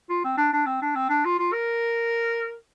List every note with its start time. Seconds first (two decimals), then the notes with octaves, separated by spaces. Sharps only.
0.10 F4
0.24 C4
0.37 D4
0.53 D4
0.66 C4
0.82 D4
0.96 C4
1.09 D4
1.25 F4
1.39 F4
1.53 A#4